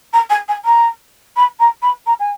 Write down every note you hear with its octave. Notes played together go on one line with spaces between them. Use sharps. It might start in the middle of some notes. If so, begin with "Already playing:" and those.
A#5
G#5
G#5
A#5
B5
A#5
B5
A#5
G#5